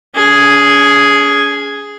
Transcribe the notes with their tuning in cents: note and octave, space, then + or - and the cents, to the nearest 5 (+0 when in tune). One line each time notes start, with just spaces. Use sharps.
C#4 +40 G#4 +0